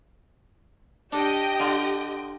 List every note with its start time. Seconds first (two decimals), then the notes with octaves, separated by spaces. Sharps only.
1.12 D4 G4 A4 D#5 G5
1.60 D3 F4